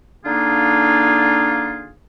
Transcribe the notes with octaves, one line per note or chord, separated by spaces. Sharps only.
D3 A#3 D4 D#4 F4 G#4